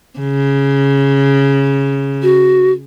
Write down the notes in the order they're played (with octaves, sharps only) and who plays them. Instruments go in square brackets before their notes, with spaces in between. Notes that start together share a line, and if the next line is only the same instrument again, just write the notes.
[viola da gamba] C#3
[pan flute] F#4